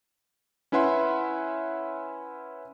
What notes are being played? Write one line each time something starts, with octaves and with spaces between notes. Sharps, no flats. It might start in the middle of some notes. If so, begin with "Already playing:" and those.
C#4 E4 B4 E5 F#5 C6